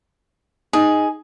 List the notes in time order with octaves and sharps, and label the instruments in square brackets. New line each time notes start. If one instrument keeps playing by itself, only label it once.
[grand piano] D#4 [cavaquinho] G#4